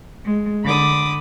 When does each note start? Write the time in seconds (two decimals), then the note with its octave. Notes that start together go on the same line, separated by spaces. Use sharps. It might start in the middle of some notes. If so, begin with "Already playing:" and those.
0.25 G#3
0.63 D3 B5 D6 D#6